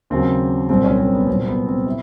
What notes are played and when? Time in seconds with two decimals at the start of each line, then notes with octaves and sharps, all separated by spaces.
0.10 D#2 C#3 F#3 C4
0.69 C2 A#2 F#3 C4
0.84 C#4
0.98 C4
1.13 B3
1.27 C2 A#2 F#3 C4
1.47 B3
1.66 C4
1.87 E4